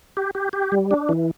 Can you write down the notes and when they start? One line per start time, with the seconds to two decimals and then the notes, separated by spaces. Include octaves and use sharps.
0.17 G4
0.35 G4
0.53 G4
0.72 G3
0.91 D4
1.09 E3